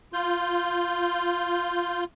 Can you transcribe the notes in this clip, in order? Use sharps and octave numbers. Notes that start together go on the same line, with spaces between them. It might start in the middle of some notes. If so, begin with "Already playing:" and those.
F4 G6